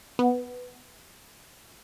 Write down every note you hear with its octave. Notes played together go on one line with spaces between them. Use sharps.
B3